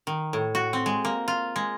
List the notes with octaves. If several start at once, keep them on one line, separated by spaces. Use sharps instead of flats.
D#3
A2
F#4
C4
G#3
A#3
F4
G#3